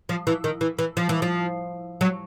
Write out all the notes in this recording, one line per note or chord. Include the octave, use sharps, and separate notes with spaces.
F3
E3
D#3
E3
E3
F3
E3
F3
F#3